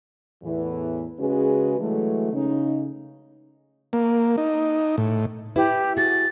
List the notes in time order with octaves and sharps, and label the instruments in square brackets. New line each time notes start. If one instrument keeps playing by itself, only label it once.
[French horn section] E2 A2 E3
C#3 G#3 C#4 F#4 G#4 B4
E3 F#3 G#3 A3
C#3 C#4 D#4
[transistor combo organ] A#3
D#4
A2
[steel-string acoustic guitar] E4 B4 E5 [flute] G4
[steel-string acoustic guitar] F#4 G#4 [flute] A6